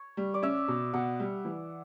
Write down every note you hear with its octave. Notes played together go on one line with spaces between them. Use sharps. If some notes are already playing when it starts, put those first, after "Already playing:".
Already playing: C#5
G3
D5
C#4 E5
B2
B2 F#5
G3
E3